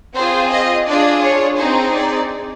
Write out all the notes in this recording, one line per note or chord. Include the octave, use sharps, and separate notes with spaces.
C4 F4 G#4 C5
D#5
D4 F4 G#4 D5
C#5
C4 D#4 G#4 C5
D5